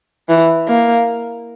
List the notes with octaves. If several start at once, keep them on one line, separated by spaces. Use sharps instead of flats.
E3
A#3